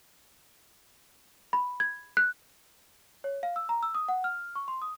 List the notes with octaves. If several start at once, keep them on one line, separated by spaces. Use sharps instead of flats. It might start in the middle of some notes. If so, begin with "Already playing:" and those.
B5
G#6
F#6
C#5
F5
E6
A#5
E6
D#6
F#5
F6
C#6
C6
D#6